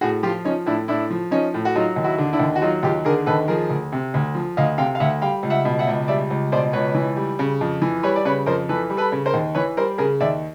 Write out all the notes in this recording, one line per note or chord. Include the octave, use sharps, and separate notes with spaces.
A2 F#4 G#4
F3 F4 G4
F3 C#4 D#4
A2 D4 E4
A2 D4 E4
F3
F3 C#4 D#4
A2
F#4
F#3 D#4 F4
D#2
E4 F#4
D3
D4 E4
D#2
F#4
F#3 D#4 F4
D#2 F4 G4
D3 G#4 A#4
D#2 A4 B4
F3 G#4 A#4
D2
C3
D2
F3
D2 D#5 F5
C3 F5 G5
F5
D2 E5 F#5
G3 F5 G5
C#2
E5 F#5
B2
E5 F#5
C#2
G3 D5 E5
C#2
B2 C5 D5
C#2 B4 C#5
E3
G3
C#3
F2
E3
G3 B4 C#5
D5
C#3 B4 C#5
F2 A#4 C5
E3 A4 B4
G3
A4 B4
C#3
A#4 C5
D#2
E3 B4 C#5
G3 A#4 C5
C#3 G#4 A#4
D#2 D5 E5